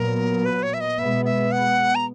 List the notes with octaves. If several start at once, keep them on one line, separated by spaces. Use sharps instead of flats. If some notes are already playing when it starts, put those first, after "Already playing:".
Already playing: A#2 F#3 B3 A#4
B4
C#5
E5
D#5
B2 G#3 B3 E5
E5
F#5
A#5